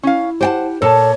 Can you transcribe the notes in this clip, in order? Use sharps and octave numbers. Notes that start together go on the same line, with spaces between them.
C#4 E4 F5
G4 C5 F#5 G5 A5
A#2 A4 C#5 A5